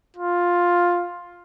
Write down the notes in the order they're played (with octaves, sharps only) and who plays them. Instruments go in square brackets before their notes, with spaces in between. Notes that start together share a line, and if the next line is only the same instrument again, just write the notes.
[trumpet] F4